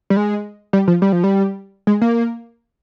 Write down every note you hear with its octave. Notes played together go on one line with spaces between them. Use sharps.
G3
G#3
G3
F3
G3
F3
G3
G#3
A#3